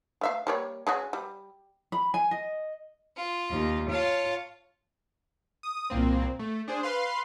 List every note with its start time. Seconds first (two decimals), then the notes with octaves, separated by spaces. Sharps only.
0.21 A3 E5 F5
0.47 G3 A#3 C#5
0.87 G#3 C#4 F#4
1.13 G3
1.92 B5
2.14 G#5
2.31 D#5
3.16 F4
3.51 D#2
3.91 F4 C#5 F5 A5
5.63 D#6
5.90 C2 A#2 A#3 C4
6.39 A3
6.68 D4 G#4 C5
6.83 B4 F5 C6